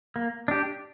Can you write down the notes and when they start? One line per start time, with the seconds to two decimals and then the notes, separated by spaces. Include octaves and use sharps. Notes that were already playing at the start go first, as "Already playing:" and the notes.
0.16 A#3
0.48 D4 G4